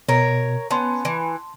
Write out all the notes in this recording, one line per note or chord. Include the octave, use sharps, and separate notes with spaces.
B2 A#4 C#5
B3 C#4 A5 C6
E3